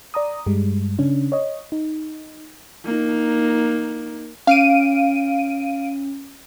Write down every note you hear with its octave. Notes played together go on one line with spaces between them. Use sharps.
D5 A#5 D#6
G2 G3 G#3
C#3 C#4 D4
C#5 D#5
D#4
A#3 D#4
C#4 F5 D7 D#7